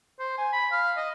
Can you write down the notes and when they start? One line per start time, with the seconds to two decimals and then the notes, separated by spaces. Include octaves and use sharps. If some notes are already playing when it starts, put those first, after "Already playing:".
0.19 C5
0.38 G#5
0.52 B5
0.72 F5
0.97 D#5